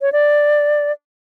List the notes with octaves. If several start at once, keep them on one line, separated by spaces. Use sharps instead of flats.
C#5
D5